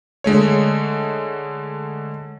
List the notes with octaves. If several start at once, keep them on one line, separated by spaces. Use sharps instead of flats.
D3 G#3 A3 C#5